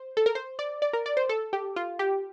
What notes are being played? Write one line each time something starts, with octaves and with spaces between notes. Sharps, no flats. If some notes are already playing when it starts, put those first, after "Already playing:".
Already playing: C5
A4
A#4
C5
D5
D5
A#4
D5
C5
A4
G4
F4
G4